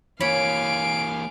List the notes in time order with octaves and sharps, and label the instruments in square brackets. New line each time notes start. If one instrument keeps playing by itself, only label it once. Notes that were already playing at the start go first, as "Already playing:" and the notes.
[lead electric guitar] E3 A#3 [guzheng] C#5 B5 [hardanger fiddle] F5 G#5 [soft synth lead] D7